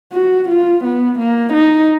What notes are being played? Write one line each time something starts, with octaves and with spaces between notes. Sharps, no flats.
F#4
F4
B3
A#3
D#4